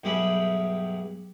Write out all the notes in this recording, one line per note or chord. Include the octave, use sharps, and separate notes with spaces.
B1 G2 G4 G#4 E5 B5